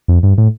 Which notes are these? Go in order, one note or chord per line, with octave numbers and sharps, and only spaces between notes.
F2
G2
A2